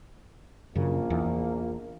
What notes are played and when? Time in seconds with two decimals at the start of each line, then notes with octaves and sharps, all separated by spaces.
0.76 A#1 F#2 C#3 A#3
1.10 E2